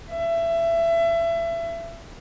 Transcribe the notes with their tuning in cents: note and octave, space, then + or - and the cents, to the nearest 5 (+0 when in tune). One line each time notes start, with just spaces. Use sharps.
E5 +25